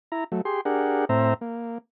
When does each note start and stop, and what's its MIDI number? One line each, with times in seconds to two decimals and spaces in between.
0.12 0.24 64
0.12 0.24 82
0.32 0.41 54
0.32 0.41 57
0.45 0.61 67
0.45 0.61 68
0.45 0.61 84
0.65 1.05 62
0.65 1.05 67
0.65 1.05 68
0.65 1.05 70
0.65 1.05 78
1.09 1.34 45
1.09 1.34 60
1.09 1.34 72
1.09 1.34 76
1.09 1.34 82
1.41 1.78 58